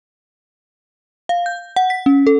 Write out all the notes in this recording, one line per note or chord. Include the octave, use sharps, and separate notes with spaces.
F5
G6
F#5
B6
C#4
A4